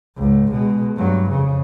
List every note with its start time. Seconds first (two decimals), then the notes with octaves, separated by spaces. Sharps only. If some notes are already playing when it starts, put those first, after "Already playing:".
0.18 C#2 G#2
0.51 B2 G#3
0.97 G2 F#3
1.30 F2 C#3